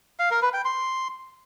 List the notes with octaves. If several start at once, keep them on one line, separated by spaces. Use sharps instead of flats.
F5
A#4
B4
G5
C6